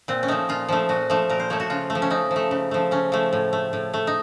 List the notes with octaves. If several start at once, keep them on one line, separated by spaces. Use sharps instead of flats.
A#2 C4
C#4
F3 A3 D#4
A#2 F4
F3 A3
A#2 F#4
F3 A3
A#2 A#4
C5
F3 A3 C#5
F#4
C#3 F4
A3
F3
C#4
C#3 D#4
F3
A3
C#3
F3 A3
C#3 C#4
F3 A3
A2
A3
A2
A3
D#4